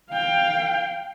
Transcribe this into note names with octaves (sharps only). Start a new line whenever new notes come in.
F5 G5